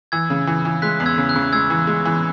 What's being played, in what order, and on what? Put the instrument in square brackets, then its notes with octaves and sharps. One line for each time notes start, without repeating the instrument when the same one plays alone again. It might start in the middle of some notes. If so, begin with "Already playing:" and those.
[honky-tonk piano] E3 [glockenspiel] E6 G#6
[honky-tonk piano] C#3
E3
E3
[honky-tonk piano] G#3 [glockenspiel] F#6 B6
[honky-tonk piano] E2
[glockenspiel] E6 G#6
[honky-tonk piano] C#3
[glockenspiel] F#6
[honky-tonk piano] C#3
[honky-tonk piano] G#3 [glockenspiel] E6 G#6
[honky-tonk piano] E3
G#3
E3